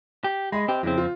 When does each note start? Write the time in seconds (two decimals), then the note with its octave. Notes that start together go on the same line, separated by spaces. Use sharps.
0.24 G4
0.52 G#3 D#5 B5
0.68 C4 G4
0.83 F2 C#3 C4 E4
0.97 F4